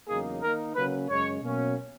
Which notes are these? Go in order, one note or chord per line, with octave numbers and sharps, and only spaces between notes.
E2 C#3 F#3 A#3 D#4 G#4
D#3 A#3 D#4 A#4
C#3 F#3 A#3 C#4 B4
F#2 C#3 G#3 C#5
B2 F#3 A#3 C#4